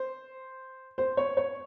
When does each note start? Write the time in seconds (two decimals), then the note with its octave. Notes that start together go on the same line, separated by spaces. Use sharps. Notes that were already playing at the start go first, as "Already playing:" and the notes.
Already playing: C5
0.98 C5
1.17 C#5
1.37 C#5